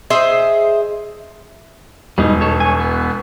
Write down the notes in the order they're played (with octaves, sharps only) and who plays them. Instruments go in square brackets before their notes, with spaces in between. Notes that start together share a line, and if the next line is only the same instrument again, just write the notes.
[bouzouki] G#4 C5 D#5 E5
[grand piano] E1 [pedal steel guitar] G3 D#4
[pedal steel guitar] A4 C#5
C#5 G#5
B3